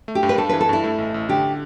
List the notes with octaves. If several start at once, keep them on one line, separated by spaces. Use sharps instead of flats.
A3
G4
G2
B4
G2 A4
E3 B4
A4
G2 E4
A3
A1
A1
D3 G4